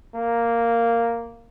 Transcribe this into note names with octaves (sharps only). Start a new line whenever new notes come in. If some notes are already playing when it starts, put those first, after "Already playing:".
A#3